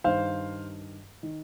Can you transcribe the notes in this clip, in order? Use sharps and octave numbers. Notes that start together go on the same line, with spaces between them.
G2 D#3 C5 F5
D#3